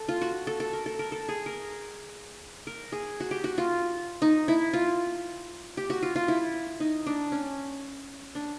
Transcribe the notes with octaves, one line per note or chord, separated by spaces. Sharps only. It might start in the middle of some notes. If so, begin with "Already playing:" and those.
Already playing: A4
F4
F#4
A4
A4
A#4
A4
A#4
A4
G#4
A#4
A#4
G#4
F#4
G4
F#4
F4
D#4
E4
F4
G4
F#4
F4
F4
E4
D#4
D4
C#4
D4